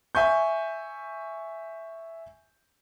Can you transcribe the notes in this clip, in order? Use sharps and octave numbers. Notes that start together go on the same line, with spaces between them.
E5 G#5 C#6 G6